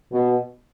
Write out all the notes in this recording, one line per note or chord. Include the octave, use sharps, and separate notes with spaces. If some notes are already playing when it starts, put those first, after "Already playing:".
B2